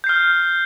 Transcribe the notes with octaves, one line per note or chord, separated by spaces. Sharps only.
F6 G6 C7